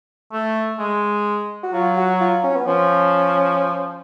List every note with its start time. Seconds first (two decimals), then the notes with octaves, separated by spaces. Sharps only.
0.32 A3
0.79 G#3
1.63 F#4
1.73 F#3 F4
1.97 F#4
2.21 F4
2.44 C#4
2.56 B3
2.67 F3 C#4